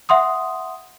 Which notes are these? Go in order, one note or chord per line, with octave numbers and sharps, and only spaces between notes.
E5 F#5 C6 D#6